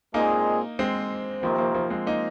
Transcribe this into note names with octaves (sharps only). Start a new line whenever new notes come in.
A#2 G#3 A#3 C4 D#4 G#4
G#3 C4
C3 D#3 F3 A#3 C4
F3 A#3
F3 A#3
G#3 C4
A#3 D#4